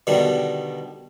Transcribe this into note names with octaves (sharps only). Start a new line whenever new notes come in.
B2 D3 D#3 G3